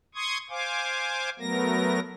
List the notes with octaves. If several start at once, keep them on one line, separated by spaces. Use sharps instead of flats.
C6 C#6 D#6 G#6
C5 F5 G#5 D6
F#3 A3 B3 A#4 A#6